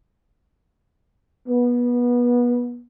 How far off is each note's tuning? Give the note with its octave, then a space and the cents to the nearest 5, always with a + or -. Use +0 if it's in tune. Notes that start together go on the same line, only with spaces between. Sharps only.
B3 -25